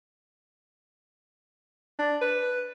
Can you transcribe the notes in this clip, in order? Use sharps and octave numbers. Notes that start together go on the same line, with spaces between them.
D4
B4